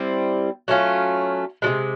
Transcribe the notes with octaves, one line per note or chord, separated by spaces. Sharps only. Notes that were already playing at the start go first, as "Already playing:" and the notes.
Already playing: G3 C4 E4
F#3 A3 C#4 F4
C3 F3 G#3